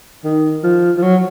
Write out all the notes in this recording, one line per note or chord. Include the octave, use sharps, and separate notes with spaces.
D#3
F3
F3
F#3